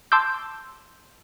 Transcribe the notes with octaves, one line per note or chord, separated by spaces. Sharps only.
A5 C6 D6 E6 G6